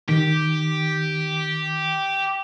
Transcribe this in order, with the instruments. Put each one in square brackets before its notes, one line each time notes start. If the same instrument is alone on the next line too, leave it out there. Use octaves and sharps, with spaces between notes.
[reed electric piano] D#3 [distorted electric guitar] G4